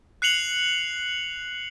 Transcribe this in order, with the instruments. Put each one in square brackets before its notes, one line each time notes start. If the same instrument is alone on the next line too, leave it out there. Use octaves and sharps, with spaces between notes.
[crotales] F#6 C7 C#7 F7 F#7